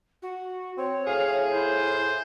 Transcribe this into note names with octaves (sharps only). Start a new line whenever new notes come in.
F#4
C4 C#5
A2 G#4 F5
E4 C5